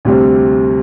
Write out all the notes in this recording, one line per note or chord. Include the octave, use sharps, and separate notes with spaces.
D2 C3 G3 C4